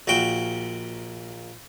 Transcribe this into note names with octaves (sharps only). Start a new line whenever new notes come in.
A#1 A#2 F#4 G5